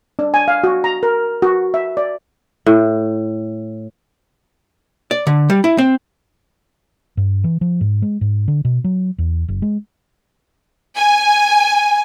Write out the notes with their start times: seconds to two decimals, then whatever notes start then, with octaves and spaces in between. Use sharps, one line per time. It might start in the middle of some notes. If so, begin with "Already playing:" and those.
0.19 D4
0.34 G#5
0.48 F5
0.64 F#4
0.84 A#5
1.03 A#4
1.42 F#4
1.74 E5
1.97 D5
2.66 A2
5.11 D5
5.27 D3
5.50 G3
5.64 E4
5.78 C4
7.17 G2
7.44 E3
7.61 F3
7.81 G#2
8.02 G#3
8.21 G#2
8.48 D3
8.65 B2
8.84 F#3
9.18 E2
9.48 F#1
9.62 G#3
10.96 G#5